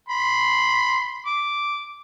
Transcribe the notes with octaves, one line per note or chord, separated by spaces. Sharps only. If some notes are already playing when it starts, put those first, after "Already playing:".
B5 C6
D6